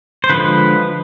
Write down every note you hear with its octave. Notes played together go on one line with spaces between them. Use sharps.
C5
D3 F3 G#3 B4